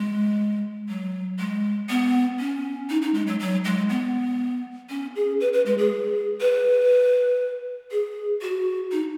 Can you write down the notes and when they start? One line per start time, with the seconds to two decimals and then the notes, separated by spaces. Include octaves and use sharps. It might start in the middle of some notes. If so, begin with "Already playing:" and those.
Already playing: G#3
0.89 F#3
1.39 G#3
1.89 B3
2.39 C#4
2.90 D#4
3.02 D#4
3.14 G#3
3.27 F#3
3.40 F#3
3.65 G#3
3.90 B3
4.90 C#4
5.15 G#4
5.40 B4
5.53 B4
5.66 G#3
5.78 G#4
6.41 B4
7.91 G#4
8.42 F#4
8.92 D#4